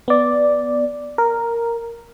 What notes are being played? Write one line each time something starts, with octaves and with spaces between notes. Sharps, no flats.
B3 D5
A#4